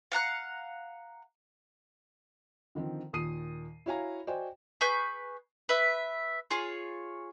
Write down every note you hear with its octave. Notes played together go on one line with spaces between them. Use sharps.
F5 F#5 A#5 F#6
D3 D#3 F3 C4
D#2 A#2 D#6 C7 D#7
E4 F#4 C#5 F5 G#5 A#5
F#4 C5 D5 D#5 G5 G#5
G#4 B4 C#6 G6
B4 E5
F4 G#4 C#5